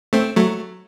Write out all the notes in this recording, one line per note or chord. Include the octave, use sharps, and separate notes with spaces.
A3 C4
F#3 A3